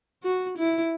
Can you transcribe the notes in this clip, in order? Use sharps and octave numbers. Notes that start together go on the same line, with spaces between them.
F#4
E4